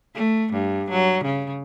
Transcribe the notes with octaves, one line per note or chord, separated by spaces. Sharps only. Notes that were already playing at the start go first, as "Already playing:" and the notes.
A3
G2
F#3
C#3